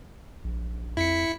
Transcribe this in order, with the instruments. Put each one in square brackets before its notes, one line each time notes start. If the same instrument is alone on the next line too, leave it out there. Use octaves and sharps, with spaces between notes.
[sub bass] A#1
[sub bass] F2 [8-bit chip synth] E4 B6 C#7